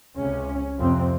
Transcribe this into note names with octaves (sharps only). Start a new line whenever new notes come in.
C#2 C3 C#4
F2 C3 C4